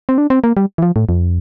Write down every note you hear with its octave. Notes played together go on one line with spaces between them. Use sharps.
C4
D4
C4
A#3
G3
E3
F3
A2
F2